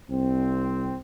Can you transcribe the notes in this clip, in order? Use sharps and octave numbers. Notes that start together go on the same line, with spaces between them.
C2 C4